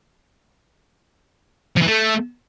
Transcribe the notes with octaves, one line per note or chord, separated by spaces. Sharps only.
F3
E3
A3